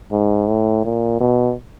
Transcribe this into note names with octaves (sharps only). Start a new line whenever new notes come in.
G#2
A2
A#2
B2